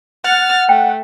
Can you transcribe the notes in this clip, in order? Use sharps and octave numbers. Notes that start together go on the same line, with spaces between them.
F#5 F6 A6
A3 G5